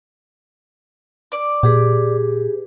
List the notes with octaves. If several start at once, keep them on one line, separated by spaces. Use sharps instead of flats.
D5 D6
A#2 G4 G#4 B4